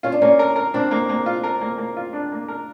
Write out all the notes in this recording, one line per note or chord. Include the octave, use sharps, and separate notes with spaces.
C#4 F4
D4
A#3 C#4
A#4
A#4
C4 D4
A#3
A#3
F4
A#4
A#3
A#3
F4
D4
A#3
A#4